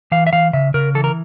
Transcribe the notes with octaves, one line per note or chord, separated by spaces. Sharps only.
E3 F5
E5
E3 F5
C#3 E5
C#3 A#4
E3 A4
A#4